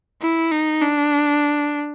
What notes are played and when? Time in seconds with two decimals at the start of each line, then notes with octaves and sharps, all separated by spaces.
0.22 E4
0.51 D#4
0.82 D4